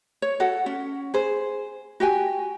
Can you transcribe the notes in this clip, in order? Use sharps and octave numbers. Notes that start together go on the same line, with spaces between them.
C#5
F#4 A4 F#5
C#4
G#4 C5
F#4 G4 G5 G#5